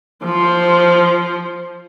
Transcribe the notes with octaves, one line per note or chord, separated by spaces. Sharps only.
F3 C5